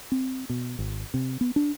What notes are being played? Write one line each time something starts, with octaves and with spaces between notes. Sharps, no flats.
C4
B2
G#1
C3
B3
D4